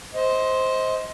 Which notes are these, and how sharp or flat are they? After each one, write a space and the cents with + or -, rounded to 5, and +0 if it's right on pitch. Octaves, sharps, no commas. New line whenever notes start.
C5 +0 D#5 +25